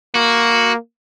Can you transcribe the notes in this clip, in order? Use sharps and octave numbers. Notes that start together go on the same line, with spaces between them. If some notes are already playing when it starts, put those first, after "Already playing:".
A#3 F#4